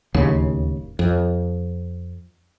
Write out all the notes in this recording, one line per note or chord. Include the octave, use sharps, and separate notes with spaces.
D1 D#2 C#3
F2